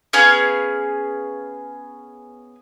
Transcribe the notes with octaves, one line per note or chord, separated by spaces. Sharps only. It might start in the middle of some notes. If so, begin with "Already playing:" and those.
B3 C#4 G#4 F5